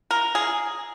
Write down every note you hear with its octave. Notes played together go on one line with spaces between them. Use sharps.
A#4
G#4